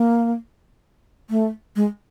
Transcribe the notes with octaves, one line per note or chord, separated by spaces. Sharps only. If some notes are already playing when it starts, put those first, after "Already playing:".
Already playing: A#3
A3
G#3